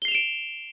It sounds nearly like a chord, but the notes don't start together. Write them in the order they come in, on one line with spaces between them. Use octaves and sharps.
G7 C7 F7 E7 D7